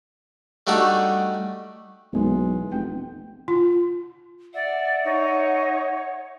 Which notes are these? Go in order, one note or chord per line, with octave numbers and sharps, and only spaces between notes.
G3 A3 D4 D#4 F#4 G4
B1 E3 G#3 B3
F1 G5
F4
D5 E5 F#5
D#4 C#5